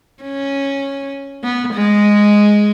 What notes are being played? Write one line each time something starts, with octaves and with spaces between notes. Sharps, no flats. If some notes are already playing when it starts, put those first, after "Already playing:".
C#4
B3
G#3